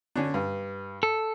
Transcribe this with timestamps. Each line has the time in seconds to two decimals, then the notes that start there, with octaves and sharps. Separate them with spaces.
0.16 D3 C#4 D4
0.34 G2
1.03 A4